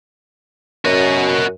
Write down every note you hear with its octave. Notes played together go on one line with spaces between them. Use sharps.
F#2 F#4 D#5